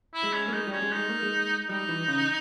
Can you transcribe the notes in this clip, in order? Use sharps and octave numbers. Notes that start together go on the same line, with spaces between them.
E4
G#3
C#4
A#3
G#3 D#4
G3
C#4
G#3
G#3 D#4
A#3
G#3
G3 D#4
E3
C#3